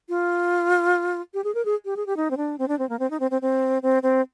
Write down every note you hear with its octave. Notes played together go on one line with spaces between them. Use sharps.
F4
G4
G#4
A#4
G#4
G4
G#4
G4
D#4
C4
D4
C4
D4
C4
A#3
C4
D#4
C4
C4
C4
C4
C4